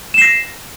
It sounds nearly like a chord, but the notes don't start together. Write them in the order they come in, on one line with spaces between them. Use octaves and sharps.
E7 C7 A#6